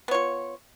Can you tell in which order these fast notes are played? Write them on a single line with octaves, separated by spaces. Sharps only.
B3 C#5 F4